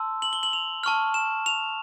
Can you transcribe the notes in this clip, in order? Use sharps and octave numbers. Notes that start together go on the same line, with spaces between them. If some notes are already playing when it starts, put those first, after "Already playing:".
Already playing: A5 C6 E6
F#7
G7
F#7
F7
A5 C#6 F6
E7
F7